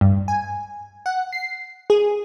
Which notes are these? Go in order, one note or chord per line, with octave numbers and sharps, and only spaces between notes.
G2
G#5
F#5
C7
G#4